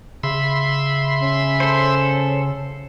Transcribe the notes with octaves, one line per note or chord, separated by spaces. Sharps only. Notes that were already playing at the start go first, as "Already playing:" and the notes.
C#3 E5 B5 C6
C#4
A4 C5